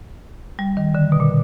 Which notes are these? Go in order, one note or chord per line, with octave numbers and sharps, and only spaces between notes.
G3
D#3
D3
B2
A#2